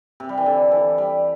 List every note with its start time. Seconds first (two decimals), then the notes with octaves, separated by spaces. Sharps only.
0.20 C3
0.29 G3
0.37 E3
0.46 D3
0.71 E3
0.98 G3